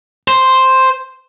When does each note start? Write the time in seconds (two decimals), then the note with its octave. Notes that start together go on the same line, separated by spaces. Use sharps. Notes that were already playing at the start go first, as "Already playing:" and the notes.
0.28 C5